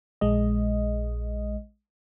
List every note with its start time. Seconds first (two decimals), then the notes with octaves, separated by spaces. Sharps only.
0.21 A#1 G#3 D#5